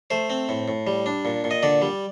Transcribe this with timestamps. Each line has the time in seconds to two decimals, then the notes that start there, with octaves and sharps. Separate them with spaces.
0.10 A3 C5
0.30 C4
0.49 A2
0.68 A2
0.87 G3
1.06 D4
1.25 A#2
1.44 A#2
1.51 D#5
1.63 D3 D5
1.82 G3